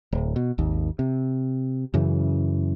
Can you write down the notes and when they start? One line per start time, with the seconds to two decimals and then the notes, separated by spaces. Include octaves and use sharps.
0.13 D1
0.36 B2
0.58 G#1 D#2
0.99 C3
1.94 F#2 C#3 E3